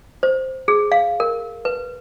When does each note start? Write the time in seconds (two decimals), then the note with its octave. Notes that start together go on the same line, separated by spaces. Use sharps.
0.23 C5
0.68 G#4
0.92 F5
1.20 A#4
1.65 B4